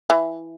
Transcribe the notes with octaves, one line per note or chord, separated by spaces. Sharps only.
E3